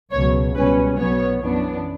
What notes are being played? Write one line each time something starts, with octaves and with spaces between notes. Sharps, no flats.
C#2 B2 F#3 C#5
C#2 B2 G3 C#4 B4
B1 B2 F#3 B3 C#5
F#2 E3 B3 D4